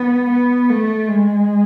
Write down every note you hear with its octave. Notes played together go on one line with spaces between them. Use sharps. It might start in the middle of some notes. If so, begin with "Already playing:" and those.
Already playing: B3
B3
A3
G#3